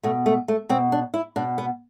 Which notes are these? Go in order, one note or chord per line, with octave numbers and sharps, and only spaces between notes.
B2 A3
A3
A3
B2 C4
D4
E4
B2 D4
B3